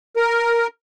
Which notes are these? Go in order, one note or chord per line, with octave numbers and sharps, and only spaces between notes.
A#4